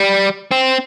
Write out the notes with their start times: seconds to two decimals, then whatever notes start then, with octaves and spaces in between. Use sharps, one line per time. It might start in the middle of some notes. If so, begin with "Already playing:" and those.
Already playing: G3
0.51 C4